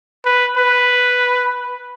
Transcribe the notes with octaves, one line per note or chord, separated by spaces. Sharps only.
B4
B4